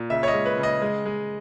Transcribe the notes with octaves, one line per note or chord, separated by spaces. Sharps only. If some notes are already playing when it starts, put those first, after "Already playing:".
Already playing: A#2
C#3 E5
C#5
D#5
G#3
B4
C#3
D#5
G#3
G#3